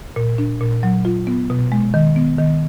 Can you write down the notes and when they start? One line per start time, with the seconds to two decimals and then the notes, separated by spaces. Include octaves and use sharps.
0.16 A#2
0.38 D4
0.61 A#2
0.83 F#3
1.05 F4
1.27 B3
1.50 B2
1.72 G#3
1.94 D#3
2.16 B3
2.38 D#3